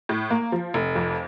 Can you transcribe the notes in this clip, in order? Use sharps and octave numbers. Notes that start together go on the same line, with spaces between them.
A2
A#3
F3
F1
F2